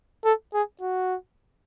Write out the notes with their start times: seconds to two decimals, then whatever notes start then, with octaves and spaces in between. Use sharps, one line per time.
0.25 A4
0.54 G#4
0.81 F#4